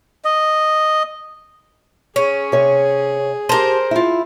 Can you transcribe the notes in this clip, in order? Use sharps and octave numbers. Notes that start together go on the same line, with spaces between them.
D#5
C#4 G#4
C3 C#5
G4 A#4 C5 A5
E4 F4